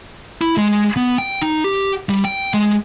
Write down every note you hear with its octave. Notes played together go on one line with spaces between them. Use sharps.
E4
G#3
B3
G5
D#4
G4
G3
G5
G#3